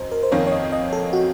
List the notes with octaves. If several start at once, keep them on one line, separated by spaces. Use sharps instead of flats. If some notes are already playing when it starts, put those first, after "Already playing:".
Already playing: F#2 C5 D#5
A#4
C5
F2 D#3 A#3 C#4 C#5
C#5
D#5
D#5
A4
F#4